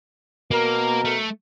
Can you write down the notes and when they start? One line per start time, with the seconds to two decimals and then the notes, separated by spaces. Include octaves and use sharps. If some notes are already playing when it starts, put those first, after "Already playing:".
0.51 B2 A#3 A#4
1.05 A3